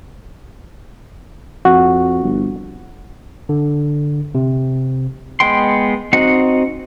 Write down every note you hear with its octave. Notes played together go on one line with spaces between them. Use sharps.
F2 F#4
G1
D3
C3
G#3 B3 G5 C6
C4 D#4 F#4 D#5 F#5